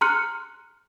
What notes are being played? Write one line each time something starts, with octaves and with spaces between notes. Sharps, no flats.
A#5 C6 F6 F#6 C#7